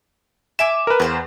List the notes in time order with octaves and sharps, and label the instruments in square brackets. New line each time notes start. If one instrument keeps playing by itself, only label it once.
[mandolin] E5 G#5 D6 [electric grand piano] E7
[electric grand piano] A#4 B4
[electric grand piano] E2 [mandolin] B4 C5 F5